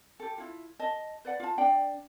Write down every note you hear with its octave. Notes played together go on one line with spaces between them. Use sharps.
G4 A4
E4 F4
D#5 A5
B4 D5 F#5
F4 A5
D4 D5 G5